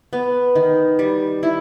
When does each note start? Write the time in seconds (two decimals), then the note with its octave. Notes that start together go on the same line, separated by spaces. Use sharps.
0.13 B3
0.55 D#3
0.99 G3
1.43 E4